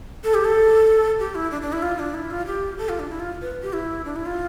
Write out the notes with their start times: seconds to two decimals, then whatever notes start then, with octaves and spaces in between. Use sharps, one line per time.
0.24 A4
0.34 G4
0.45 A4
1.19 G4
1.35 E4
1.51 D4
1.62 D4
1.73 E4
1.82 F4
1.99 D4
2.14 E4
2.31 F4
2.46 G4
2.78 A4
2.89 F4
2.99 D4
3.10 E4
3.20 F4
3.42 B4
3.63 G4
3.73 E4
4.05 D4
4.16 E4
4.26 F4